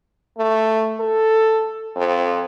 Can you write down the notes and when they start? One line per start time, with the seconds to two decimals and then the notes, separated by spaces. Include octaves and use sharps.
0.38 A3
1.00 A4
1.96 F2